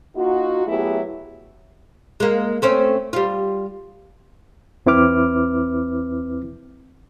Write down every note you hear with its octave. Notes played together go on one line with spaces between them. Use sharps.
A#3 D#4 F4 F#4
F#3 A3 B3 E4 G4 G#4
G#3 A#3
A3 C4 C#4
G3 F4
E2 C4 E4 B4 D6 F6